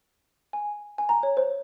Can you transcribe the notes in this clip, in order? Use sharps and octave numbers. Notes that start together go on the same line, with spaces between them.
G#5
G#5
A#5
C#5
C5